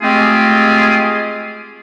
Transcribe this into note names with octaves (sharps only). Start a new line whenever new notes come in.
G#3 A3 C4 F4 G4 G#4